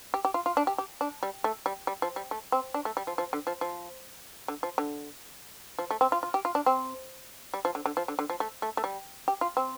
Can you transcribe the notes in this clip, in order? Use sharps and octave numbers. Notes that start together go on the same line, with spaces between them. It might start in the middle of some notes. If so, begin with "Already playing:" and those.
G4
G4
F4
F4
D4
G4
G4
D4
G3
A3
G3
G3
F3
G3
A3
C4
D4
A3
G3
F3
F3
D3
F3
F3
D3
F3
D3
F3
A3
C4
F4
F4
G4
F4
D4
C4
G3
F3
D3
D3
F3
D3
D3
F3
A3
A3
A3
G3
G4
F4
C4